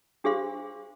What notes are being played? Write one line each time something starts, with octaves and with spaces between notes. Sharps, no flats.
D4 G4 G#4 C5 F5 C6